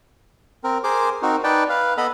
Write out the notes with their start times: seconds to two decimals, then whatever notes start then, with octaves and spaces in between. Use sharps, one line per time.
0.64 C4 A#4
0.84 G#4 A#4 C5 D6
1.22 C4 D#4 F#4 A#4
1.44 D#4 B4 D5 G5 A5
1.69 B4 F5
1.97 B3 A4 D#5 B5